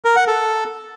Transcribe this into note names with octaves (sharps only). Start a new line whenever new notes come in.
A#4
F#5
A4